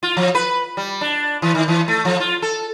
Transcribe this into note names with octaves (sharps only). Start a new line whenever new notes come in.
F4
F3
B4
G3
D4
E3
D#3
E3
A3
F3
F4
A4